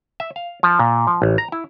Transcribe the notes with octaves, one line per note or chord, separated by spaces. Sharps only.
E5
F5
F3
A#2
F3
A1
A#5
E4